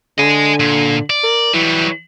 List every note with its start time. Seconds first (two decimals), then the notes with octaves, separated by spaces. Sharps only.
0.18 D3 D#5 G#5
0.60 A#2
1.10 D5
1.23 A#4
1.53 E3 F#3 G3